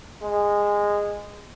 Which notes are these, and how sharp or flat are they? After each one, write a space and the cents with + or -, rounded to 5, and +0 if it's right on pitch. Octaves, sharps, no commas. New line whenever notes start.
G#3 -15